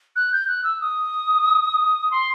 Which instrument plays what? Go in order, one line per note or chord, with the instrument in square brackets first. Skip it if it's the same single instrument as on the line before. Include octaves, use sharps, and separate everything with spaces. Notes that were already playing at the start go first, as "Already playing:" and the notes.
[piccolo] F#6
G6
F#6
E6
D#6
C6